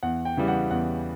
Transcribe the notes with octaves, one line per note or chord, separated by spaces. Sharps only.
E2 F#5
G5
C#3 E3 G3
F#5
E2 F#5